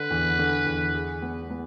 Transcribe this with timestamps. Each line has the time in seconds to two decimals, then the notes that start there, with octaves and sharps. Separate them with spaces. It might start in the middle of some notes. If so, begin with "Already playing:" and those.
Already playing: D3 B4
0.10 E2
0.39 D3
0.66 E2
0.94 G#4
1.22 B3
1.50 B3